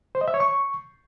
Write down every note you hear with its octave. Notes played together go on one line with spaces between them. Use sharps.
C5
D#5
E5
C#5
C#6